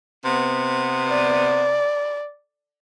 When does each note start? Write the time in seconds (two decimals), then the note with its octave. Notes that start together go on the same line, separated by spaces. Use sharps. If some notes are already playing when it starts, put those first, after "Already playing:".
0.25 C3 B3
1.08 D5